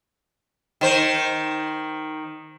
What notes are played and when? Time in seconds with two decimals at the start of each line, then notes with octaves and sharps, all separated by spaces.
0.81 D#3 C5